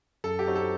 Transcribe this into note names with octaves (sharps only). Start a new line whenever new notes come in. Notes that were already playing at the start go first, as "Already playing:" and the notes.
F#2 A4
G4
F#3 C4 D#4 F#4
A4